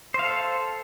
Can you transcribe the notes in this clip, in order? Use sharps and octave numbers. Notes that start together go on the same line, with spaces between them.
A4 C5 F5